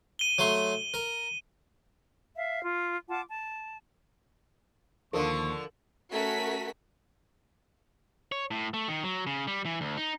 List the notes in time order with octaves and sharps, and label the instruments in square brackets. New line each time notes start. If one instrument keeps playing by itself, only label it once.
[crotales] D#7 G7
[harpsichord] F#3 A3 C6
A#4
[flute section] E5 F5
F4
F4 F#5 A5 D6
A5
[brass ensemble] D#2 [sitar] D3 F3 [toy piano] A4 A#4 F5 [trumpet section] C#6
[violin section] A3 C#4 F#4 A#4 B6
[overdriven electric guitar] C#5
A2
A3
D#3
F#3
C#3
G3
E3
D2
D#4